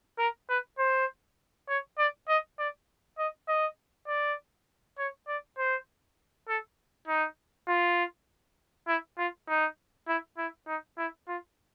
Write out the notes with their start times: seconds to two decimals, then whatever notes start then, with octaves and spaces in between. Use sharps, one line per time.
0.19 A#4
0.49 B4
0.79 C5
1.69 C#5
1.99 D5
2.28 D#5
2.59 D5
3.19 D#5
3.48 D#5
4.08 D5
4.98 C#5
5.28 D5
5.58 C5
6.49 A4
7.08 D#4
7.68 F4
8.88 E4
9.18 F4
9.48 D#4
10.08 E4
10.38 E4
10.67 D#4
10.98 E4
11.28 F4